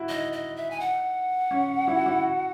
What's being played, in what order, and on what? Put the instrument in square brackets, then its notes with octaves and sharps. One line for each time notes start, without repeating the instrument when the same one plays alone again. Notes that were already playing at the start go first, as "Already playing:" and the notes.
Already playing: [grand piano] E4 F#4
[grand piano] D#4 [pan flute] D#5
[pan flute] D#5
E5
G#5
F#5
[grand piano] C#4
E4
F#4
E4
F#4